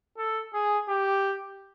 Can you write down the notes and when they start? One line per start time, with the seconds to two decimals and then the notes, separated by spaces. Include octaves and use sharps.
0.18 A4
0.54 G#4
0.89 G4